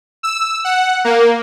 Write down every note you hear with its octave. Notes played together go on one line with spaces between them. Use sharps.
E6
F#5
A#3